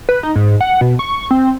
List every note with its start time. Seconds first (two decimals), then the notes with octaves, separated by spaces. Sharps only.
0.09 B4
0.23 D#4
0.36 G#2
0.61 F#5
0.81 B2
0.99 C#6
1.31 C4